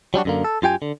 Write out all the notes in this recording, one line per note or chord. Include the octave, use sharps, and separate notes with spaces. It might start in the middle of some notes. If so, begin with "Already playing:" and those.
F#3 G3 D4 F#4
F#2 D3 A#3
A4
F#2 F4 G4 G5 G#5
D3